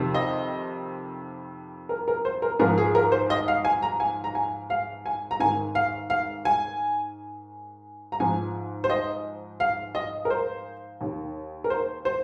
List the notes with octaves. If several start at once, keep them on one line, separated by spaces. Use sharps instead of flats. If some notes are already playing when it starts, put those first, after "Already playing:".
Already playing: F2 C3 D#3
D#5
A#4
A#4
C5
A#4
G#2 F3 A#4
G#4
A#4
C5
D#5
F5
G#5
A#5
G#5
A#5
G#5
F5
G#5
A#5
G#2 D#3 G#5
F5
F5
G#5
A#5
G#2 F3 G#5
C5
D#5
F5
D#5
A#4
C5
D#2 D#3
A#4
C5
C5